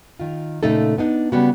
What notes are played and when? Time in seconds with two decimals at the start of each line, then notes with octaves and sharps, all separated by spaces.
0.19 D#3 F4
0.63 A#2 C#3 A3 D#4 A4
0.98 B3 D4 D#4
1.32 C#3 G3 B3 F#4